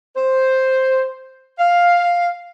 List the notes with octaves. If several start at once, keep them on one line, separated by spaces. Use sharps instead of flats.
C5
F5